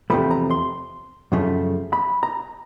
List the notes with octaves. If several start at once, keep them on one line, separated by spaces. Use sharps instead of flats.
E2 C3 F3 A3 B5
A#5
C6
F#2 C#3 F3 A3
B5
A#5